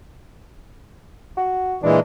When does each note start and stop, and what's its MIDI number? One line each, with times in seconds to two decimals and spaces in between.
1.37 1.77 66
1.83 2.00 46
1.83 2.00 52
1.83 2.00 56
1.83 1.98 62